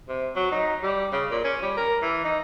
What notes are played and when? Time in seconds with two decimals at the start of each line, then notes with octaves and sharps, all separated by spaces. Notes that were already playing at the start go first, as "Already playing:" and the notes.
0.09 C3
0.36 F#3
0.52 D#4
0.83 G3
1.13 C#3
1.31 A#2
1.44 C#4
1.62 G3
1.77 A#4
2.02 E3
2.24 D#4